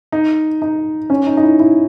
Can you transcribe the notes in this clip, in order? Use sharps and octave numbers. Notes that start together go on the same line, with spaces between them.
D#4
D#4
C#4
D#4
D#4
E4
E4